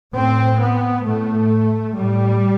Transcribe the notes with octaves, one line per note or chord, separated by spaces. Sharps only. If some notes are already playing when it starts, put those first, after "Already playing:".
A2 C4
B3
A2 A3
A2 G3